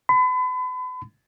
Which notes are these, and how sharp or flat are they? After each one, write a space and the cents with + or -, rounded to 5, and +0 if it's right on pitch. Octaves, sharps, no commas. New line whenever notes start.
B5 +40